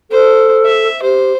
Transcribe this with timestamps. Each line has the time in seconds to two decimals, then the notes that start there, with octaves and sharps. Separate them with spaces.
0.11 A4 C5
0.65 E5
1.02 G4 C5